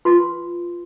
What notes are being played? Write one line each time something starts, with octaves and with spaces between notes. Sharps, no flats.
F4 B4 C6